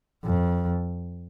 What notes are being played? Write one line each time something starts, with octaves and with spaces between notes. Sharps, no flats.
F2